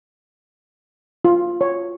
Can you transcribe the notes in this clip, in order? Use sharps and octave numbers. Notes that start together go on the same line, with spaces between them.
F4
C#5